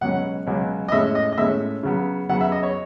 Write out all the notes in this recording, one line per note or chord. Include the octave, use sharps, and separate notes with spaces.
C#2 B2 F#3 C#4 F#5
C#2 B2 F#3 C#4
D#5
A2 G#3 C#4 E5
D#5
D#5
A2 G#3 C#4 E5
C#3 F#3 B3
C#3 F#3 B3 F#5
E5
D#5
C#5